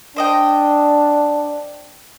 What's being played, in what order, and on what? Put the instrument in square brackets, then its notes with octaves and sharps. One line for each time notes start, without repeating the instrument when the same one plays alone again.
[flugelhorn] D4 [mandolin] C5 D#5 G5